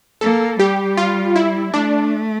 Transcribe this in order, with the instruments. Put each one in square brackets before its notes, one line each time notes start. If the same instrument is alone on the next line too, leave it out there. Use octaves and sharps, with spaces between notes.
[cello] A#3 [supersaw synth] A4
[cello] G3 [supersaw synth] G4
[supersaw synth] F4
E4
[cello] A3 [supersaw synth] D4